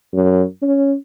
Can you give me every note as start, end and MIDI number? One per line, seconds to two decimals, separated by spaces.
0.13 0.43 42
0.62 0.94 61